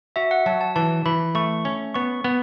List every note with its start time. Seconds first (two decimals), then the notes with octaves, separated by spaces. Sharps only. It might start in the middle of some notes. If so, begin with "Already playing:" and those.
0.16 F#4 E5
0.31 F#5
0.46 F#3 A5
0.61 A5
0.76 E3 A5
1.06 E3 B5
1.35 A3 C#6
1.65 C#4
1.94 B3 C#6
2.24 B3